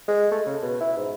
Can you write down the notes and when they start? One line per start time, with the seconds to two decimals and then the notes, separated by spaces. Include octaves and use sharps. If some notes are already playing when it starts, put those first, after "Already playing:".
0.08 G#3
0.31 A3
0.46 C#3
0.63 B2
0.80 E4
0.97 G#2